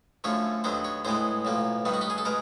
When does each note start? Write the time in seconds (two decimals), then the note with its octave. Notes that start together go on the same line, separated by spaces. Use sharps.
0.24 F#2 D3 F3 A3 C#5
0.64 D#2 D3 F#3 B3 C5
0.84 C#5
1.05 A2 E3 G#3 B3 C5
1.45 B1 A2 F3 A#3
1.85 G2 D#3 G3 B3
1.94 F#4
2.01 G4
2.10 G#4
2.18 A4
2.25 B2 G#3 B3 A#4